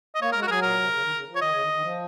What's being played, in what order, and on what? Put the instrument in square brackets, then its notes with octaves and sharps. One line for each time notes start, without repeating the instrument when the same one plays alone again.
[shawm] D#5
[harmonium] A#3 [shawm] C#5
[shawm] A#4
[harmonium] G#3
[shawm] F#4
[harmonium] F#3 [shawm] G#4 A#4
[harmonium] A#2 [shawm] A#4
[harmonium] C3
C#3
D#3
C#3
F3
[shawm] C#5
[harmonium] D#3 [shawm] D#5
[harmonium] C#3
D#3
D#3
F3